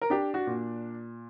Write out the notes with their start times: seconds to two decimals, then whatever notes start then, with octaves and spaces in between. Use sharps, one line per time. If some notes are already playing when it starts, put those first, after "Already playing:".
0.02 A#4
0.10 D4 G4
0.34 F#4
0.47 A#2